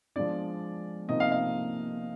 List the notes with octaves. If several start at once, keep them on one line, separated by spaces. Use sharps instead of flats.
F3 G#3 D4 D5
C3 F3 A#3 D#4 D#5
F5
F5